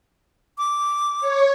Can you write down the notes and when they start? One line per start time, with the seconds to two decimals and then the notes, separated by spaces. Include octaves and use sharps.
0.58 D6
1.20 C#5